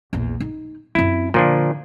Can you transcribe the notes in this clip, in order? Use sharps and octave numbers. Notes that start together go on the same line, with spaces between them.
A#1 E2
D#4
F#2 C4 E4
A#2 D3 F3 D4